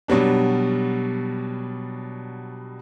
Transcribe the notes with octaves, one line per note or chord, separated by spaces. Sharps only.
B2 F#3 G3 D4